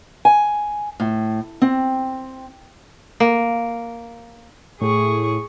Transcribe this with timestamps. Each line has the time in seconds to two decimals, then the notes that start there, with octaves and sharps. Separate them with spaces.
0.25 G#5
1.00 A2
1.62 C4
3.20 A#3
4.81 A2 G#4 C#6